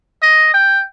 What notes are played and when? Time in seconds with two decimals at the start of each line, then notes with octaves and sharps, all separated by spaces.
0.22 D#5
0.54 G5